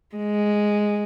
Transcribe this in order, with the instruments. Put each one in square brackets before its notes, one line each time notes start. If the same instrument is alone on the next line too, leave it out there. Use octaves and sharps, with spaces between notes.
[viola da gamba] G#3